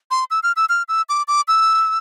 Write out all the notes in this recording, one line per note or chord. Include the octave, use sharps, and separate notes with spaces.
C6
E6
F6
E6
F6
E6
D6
D6
E6